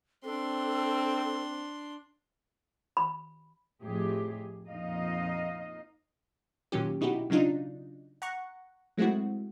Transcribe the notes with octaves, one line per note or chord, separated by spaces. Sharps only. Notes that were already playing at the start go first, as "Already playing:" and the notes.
C4 D4 A4 C6
B5
F2 A2 G4 G#4
F2 A#2 D#4 D#5 F5
A#2 D#3 F#3 C#4 G4
B2 D#4 E4 F#4 G4
C#3 F#3 D4 D#4 F4
F#5 A#5 C#6
F#3 G#3 A3 C4 E4 F#4